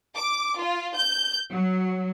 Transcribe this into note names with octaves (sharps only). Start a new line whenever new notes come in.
D6
F4
G6
F#3